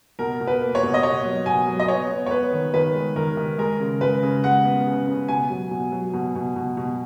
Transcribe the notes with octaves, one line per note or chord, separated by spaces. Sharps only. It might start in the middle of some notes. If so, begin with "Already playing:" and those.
B2 A#4
B2
B4
A#3
C#5
B2
D#5
B2 C#5
F#3
B2 G#5
F#3
D#5
B3 C#5
B3
C#5
B3 B4
D#3
D#3 B4
G#3
D#3 A#4
D#3
G#3 A#4
C#3
G#3 B4
C#3
G#3 F#5
B3
C#3
C#3
B2 G#5
F#3
B2
F#3
B2
B2
B2
B2